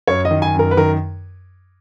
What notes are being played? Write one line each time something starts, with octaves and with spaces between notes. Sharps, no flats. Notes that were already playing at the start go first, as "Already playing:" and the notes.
F#2 C#5
D#5
D#3
G#5
F#2 A#4
B4
D#3 A#4